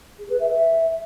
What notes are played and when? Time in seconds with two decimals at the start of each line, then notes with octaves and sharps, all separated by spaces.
0.19 G#4
0.30 B4
0.40 E5
0.50 E5